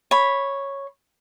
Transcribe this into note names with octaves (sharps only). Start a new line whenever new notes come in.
C#5 B5